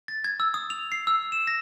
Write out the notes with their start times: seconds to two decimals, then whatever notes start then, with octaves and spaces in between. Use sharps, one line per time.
0.08 A6
0.24 G#6
0.40 E6
0.54 D#6
0.70 F7
0.92 C7
1.07 E6
1.32 E7
1.47 A#6